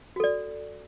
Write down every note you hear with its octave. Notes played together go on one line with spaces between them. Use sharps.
F#4 A4 D5